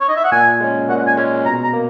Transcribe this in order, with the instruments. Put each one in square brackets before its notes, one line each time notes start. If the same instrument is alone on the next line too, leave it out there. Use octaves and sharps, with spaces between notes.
[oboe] C#5
D#5
E5
F#5
[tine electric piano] A#2 [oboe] G#5
[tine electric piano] G#3 C#4
[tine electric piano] A#2 [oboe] F#5
[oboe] G#5
[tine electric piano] G#3 C#4
[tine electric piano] B2 [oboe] A#5
[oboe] A#5
[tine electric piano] A#3